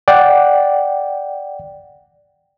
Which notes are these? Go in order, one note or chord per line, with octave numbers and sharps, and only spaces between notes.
D5 F#5 G5